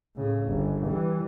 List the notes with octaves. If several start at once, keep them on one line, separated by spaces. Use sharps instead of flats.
A2 C#3
G1
E3 G3